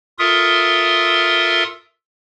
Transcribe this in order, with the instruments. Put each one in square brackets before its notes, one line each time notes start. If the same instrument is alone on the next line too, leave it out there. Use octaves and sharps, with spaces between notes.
[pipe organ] F4 A4 A#4 E5 C6 D#6